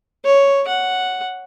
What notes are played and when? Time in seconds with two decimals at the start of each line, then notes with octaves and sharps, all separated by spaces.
0.25 C#5
0.67 F#5